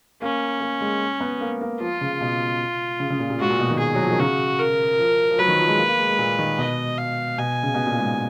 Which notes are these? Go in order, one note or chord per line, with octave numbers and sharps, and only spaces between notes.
A#3 C#4
A#3
G#3
B3
A#3
A#3
F3 F4
C#3
B2
C#3
C#3
A#2
A#2
G#2 F#4
A#2
B2
D#3
G#4
F#3
F3
D#3
C#3 F#4
A#4
F3
F3
F#3 B4
D#3
F3
G#3
A#3
A#3
G#3
G#3
A#2
D#3
B2 D#5
F5
B2 G#5
C#3
B2
A#2
G#2